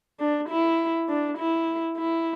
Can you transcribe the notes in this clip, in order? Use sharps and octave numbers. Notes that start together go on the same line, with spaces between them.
D4
E4
D4
E4
E4